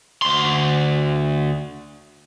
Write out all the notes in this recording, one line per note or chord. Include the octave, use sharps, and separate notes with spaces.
D2 C6